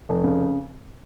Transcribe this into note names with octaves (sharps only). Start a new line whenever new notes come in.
F1
C#3